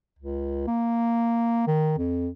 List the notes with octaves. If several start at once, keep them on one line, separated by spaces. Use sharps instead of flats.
C#2
A#3
D#3
F2